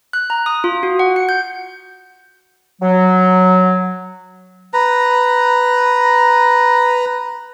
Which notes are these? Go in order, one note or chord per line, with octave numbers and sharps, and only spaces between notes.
F#6
A#5
D#6
F4
F#4
F#5
C#7
G6
F#3
B4 A#5